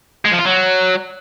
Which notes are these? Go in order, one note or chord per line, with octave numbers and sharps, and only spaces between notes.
G#3
F3
F4
F#3